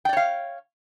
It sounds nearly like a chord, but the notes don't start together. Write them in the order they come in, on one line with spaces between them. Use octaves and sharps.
G5 D5 C#5 F5